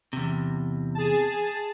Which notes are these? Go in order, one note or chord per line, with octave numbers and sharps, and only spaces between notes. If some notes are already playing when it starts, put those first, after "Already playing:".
E2 C3
G#4 A5